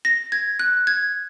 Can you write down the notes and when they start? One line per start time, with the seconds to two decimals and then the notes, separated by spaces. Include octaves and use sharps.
0.05 A#6
0.32 G#6
0.59 F#6
0.87 G#6